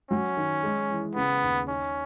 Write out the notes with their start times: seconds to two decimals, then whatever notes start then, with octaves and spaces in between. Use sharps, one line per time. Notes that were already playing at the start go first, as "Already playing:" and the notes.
0.11 F#3 C#4
0.37 D#3
0.63 G#3
0.90 E3
1.15 C#3 B3
1.42 D#2
1.68 C#4 D#4